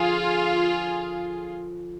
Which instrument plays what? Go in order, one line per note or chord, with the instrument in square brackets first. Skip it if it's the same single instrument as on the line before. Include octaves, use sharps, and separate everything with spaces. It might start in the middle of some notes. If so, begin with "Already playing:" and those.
Already playing: [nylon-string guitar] D3 F3 [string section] F4 G#4